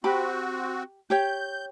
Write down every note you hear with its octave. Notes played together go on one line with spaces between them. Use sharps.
C4 F#4 G4 B5
G4 C#5 G5 G6